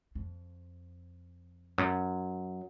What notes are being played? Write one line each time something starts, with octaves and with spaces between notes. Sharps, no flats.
F2
F#2